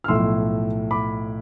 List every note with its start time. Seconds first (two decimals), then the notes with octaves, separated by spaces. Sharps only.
0.04 F6
0.08 B1 A2 F3 C6 E6
0.91 B5 D6